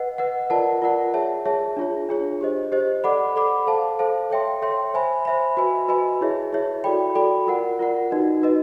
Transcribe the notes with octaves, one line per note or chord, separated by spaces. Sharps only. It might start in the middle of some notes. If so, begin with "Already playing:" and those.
Already playing: B4 D#5 F#5
B4 D#5 F#5
F4 A#4 D5 F#5 A5
F4 A#4 D5 F#5 A5
G#4 C#5 E5 A5
G#4 C#5 E5 A5
D4 F4 G#4 C#5
D4 F4 G#4 C#5
G4 C5 D#5
G4 C5 D#5
A4 D5 F#5 B5 D6
A4 D5 F#5 B5 D6
A4 C5 F5 A5
A4 C5 F5 A5
A4 C#5 E5 G5 C6
A4 C#5 E5 G5 C6
C5 E5 G#5 B5
C5 E5 G#5 B5
F#4 B4 D#5 G#5 B5
F#4 B4 D#5 G#5 B5
E4 G#4 C#5 E5
E4 G#4 C#5 E5
F#4 A4 D5 G5 B5
F#4 A4 D5 G5 B5
F4 A#4 D5 F#5
F4 A#4 D5 F#5
D#4 F#4 B4 D#5
D#4 F#4 B4 D#5